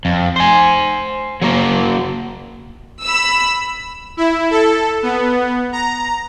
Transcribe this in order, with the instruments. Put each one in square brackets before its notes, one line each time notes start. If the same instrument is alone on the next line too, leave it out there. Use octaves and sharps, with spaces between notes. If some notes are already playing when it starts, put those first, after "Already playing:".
[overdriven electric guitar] F2
C5 G#5
F#3 A#3
[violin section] B5 E6
[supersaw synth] E4
A4
B3
A#5